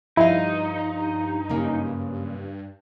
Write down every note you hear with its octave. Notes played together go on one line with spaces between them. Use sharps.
G2 F3 D#4 E4 F5
F#2 C#3 A#3